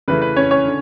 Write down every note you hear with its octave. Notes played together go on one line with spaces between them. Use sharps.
C#3 E3 A3 B4
B4
C#4 C#5
C#4 C#5
D3